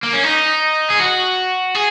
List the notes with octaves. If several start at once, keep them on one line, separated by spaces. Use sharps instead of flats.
A#3
C#4
D#4
G#4
F#4
G#4